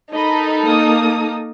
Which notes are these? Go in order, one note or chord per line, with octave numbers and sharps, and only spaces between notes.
D#4 A4 A#4 D#5 B5
A#3 D#6